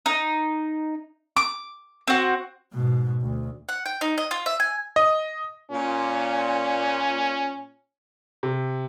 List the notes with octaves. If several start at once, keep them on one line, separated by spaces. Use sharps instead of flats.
D#4
D6
C4 F#4
G#2 B2
D2
F#5
G5
D#4
D#5
F4
E5
G#5
D#5
A#2 C#4
C3